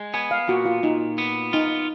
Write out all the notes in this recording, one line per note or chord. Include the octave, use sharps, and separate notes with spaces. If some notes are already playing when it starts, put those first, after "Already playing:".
Already playing: G#3
B3 G#5
F5
A#2 F#4
F4
A#2 D#4
B3
D#4 F4